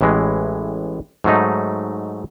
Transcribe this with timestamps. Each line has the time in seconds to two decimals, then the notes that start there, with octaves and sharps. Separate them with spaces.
0.01 A1 A2 E3 G#3
1.24 G#2 F#3 A3 D#4